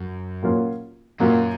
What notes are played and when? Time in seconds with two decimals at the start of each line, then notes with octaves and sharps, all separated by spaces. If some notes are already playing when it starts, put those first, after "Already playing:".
Already playing: F#2
0.42 A#2 F#3 A#3 C#4 F4
1.20 F#2 A#2 F#3 A#3 C#4 F4